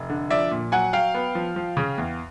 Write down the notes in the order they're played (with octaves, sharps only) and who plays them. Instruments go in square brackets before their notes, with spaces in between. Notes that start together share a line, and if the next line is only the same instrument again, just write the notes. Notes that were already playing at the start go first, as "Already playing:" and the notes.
Already playing: [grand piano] F1
D3
F3 D5 E5
A#2
F#3 F#5 G#5
F#3 F5 G5
B3
F3
F3
C#3
E2